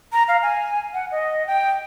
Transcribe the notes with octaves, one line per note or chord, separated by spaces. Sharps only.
A#5
F5
G#5
F#5
D#5
G5